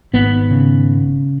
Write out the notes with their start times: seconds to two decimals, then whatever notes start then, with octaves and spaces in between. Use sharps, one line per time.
0.13 G#1 B3
0.50 C#3